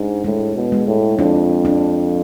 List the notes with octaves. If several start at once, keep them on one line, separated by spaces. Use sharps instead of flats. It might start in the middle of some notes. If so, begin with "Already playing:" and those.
Already playing: G#2 D4
A2 G#3
B2
G#3
A2
F2 D4
D4